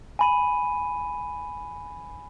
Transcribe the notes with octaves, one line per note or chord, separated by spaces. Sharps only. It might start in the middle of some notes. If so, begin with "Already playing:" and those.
G#5 B5 D#7